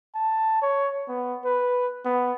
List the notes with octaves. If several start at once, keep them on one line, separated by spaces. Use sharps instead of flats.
A5
C#5
B3
B4
B3